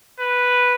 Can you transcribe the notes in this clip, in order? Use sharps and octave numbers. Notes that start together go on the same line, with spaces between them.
B4